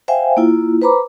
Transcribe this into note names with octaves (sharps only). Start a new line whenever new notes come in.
C5 E5 F5 G5 G#5
A#3 E4 F4
B4 C5 A#5 B5 D6